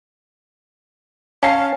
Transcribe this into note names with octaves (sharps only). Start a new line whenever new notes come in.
C#4 F5 A5 C7